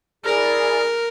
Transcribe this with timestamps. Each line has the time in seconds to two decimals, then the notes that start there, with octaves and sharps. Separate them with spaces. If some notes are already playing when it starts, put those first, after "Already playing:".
0.25 E4 G#4 A#4 D5